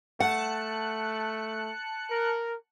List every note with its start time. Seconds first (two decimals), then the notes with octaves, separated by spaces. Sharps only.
0.20 A3 F#5 A5 F#6 C#7
2.11 A#4